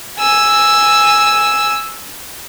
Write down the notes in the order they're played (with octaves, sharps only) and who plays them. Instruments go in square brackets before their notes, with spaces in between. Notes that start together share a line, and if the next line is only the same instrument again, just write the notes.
[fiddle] G#5 E6